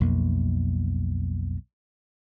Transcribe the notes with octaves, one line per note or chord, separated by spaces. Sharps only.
B1 F2 A#3